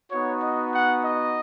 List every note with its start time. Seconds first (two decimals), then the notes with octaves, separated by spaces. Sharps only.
0.11 B3 D#4 F#4 C#5
0.42 D#5
0.73 F#5
1.04 D#5